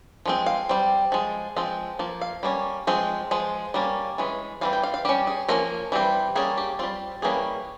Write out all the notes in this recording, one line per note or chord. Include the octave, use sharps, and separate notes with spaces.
F3 G#3 C4
F5
G3 C4
F3 G#3
F3 G#3 C4
F3 A#3
F5
G3 A#3 C#4
F3 G#3 C4
F3 G#3
G3 A#3 C#4
E3 G#3 C#4
E3 G3 C4 F5
G5
F5
F5
G3 C#4 G4
G#4
F3 A#3 C#4 A#4
E3 G3 C4
G3 A#3 C#4 G#4
G4
G3 C4 F4
E3 G3 A#3 C#4 G#4